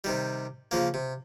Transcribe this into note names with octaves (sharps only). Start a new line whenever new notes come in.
C3 D#3 G3
C#3 F3 A#3
C3